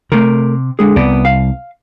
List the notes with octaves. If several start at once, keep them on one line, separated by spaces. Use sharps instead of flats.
C3 A3 A#4
D3 G#3 G#4
C2 B3 D5
F5